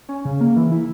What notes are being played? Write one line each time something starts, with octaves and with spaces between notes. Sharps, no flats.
C#4
C#3
A#3
E3
E4